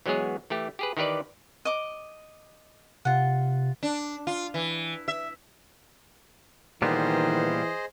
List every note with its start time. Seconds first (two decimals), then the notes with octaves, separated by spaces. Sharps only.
0.06 E3 F#3 G#3 B3 G#4 C#5
0.50 E3 A3 G4
0.79 G4 G#4 B4
0.97 D#3 E3 G4 B4 D5
1.65 D#5 D6
3.05 C3 F4 F#5
3.83 D4
4.27 F4
4.54 E3
5.08 E5
6.82 A#2 D#3 E3 G3 B3 G#4 C5 D#5